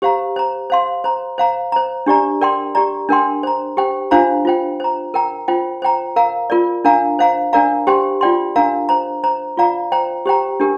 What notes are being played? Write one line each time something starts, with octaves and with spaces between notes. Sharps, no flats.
G4 C5 F5 A#5
C5 A#5
C5 F5 C6
C5 A#5
C5 F5 A#5
C5 A#5
D4 G4 D5 A#5
A#4 D5 G5 C6
G4 D5 A#5
D4 A#4 G5 C6
C5 A#5
G4 C5 G5
D4 F4 C5 F5 A#5
F4 C5 G5
C5 A#5
A#4 G5 A#5
F4 C5 G5
C5 G5 A#5
A#4 F5 A#5
F4 A#4 D5
D4 A#4 F5 A#5
C5 F5 A#5
D4 A#4 D5 F5 A#5
G4 C5 G5 C6
F4 D5 G5 C6
D4 A#4 F5 A#5
C5 A#5
C5 A#5
F4 D5 F5 A#5
C5 G5 A#5
G4 C5 G5 A#5
D4 G4 A#4